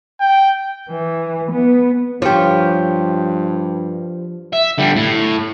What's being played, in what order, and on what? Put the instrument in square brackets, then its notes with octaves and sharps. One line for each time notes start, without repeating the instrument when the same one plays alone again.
[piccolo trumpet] G5
[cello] E3
B3
[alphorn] G2 [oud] F3 [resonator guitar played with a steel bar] G4 C#5
[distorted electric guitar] E5
D3 G3
A2